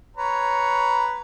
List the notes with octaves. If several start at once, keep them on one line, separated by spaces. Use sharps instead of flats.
B4 C#5 A#5